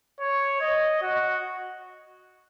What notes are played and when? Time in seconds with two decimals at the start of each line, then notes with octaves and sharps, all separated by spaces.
0.20 C#5
0.61 D#5
1.03 F#4